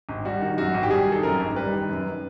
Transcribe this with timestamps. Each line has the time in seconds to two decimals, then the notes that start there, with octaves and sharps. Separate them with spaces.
0.09 G#1
0.25 G3 F#4
0.41 D#3
0.58 F#2 F#4
0.74 G#1
0.83 G4
0.90 G3 G#4
1.07 D#3
1.12 A4
1.23 F#2 A#4
1.40 G#1
1.56 G3 B4
1.73 D#3
1.89 F#2